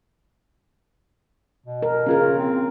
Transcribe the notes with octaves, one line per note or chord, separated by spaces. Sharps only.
B2
A#4
C#3 C#4 F4 A#4
C4